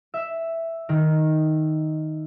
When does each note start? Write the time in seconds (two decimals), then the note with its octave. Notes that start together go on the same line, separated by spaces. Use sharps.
0.14 E5
0.89 D#3